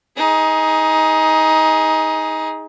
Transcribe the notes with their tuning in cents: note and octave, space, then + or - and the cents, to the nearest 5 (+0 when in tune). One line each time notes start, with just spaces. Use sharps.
D#4 +20 G#4 +0